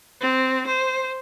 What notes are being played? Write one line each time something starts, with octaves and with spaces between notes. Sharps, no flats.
C4
C5